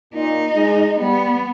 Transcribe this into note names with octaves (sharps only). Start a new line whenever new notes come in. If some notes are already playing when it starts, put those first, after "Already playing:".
A#2 D#4
G#3
G3 B3